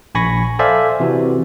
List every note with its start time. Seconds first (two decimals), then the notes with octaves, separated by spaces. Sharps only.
0.15 A#1 G#5 B5 C#6 A#6
0.59 A4 C5 D5 E5 F5 G#5
1.00 C3 E3 F#4